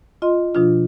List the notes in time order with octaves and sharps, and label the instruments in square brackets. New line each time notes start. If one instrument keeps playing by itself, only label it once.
[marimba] F4 D#5 C6
B2 F3 D4 F4